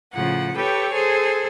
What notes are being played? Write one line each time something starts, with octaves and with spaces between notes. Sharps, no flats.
A2 C#3 F3 F#5
G4 A4 B4 C#5 G5
G#4 A4 C5 G#5